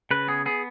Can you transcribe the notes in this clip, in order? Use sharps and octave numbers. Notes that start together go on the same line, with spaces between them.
C#3 B4
B3 G#4
B3 G#4